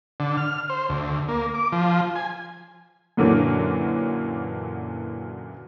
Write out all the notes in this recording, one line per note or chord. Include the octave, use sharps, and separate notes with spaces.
D3
F6
C5
D2
A#3
D6
F3
G#5
F#2 A#2 D3 E3 F#3 A#3